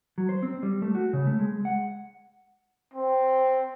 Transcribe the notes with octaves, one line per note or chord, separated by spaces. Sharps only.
F#3
C5
C4
G3
A3
F#4
C#3
A3
G#3
F#5
C4